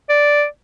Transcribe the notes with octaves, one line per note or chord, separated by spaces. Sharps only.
D5